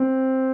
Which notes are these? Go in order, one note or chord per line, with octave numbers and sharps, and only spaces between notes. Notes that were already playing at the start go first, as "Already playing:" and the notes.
Already playing: C4